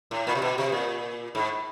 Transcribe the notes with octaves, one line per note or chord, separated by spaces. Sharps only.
A2
A#2
C3
B2
C3
A#2
G#2